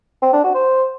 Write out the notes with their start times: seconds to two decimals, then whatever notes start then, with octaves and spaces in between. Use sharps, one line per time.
0.22 C4
0.33 D4
0.44 F#4
0.55 C5